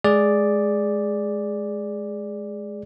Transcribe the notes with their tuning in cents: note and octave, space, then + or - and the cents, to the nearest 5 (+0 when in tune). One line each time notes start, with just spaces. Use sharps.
G#3 +20 G#4 +0 D5 +0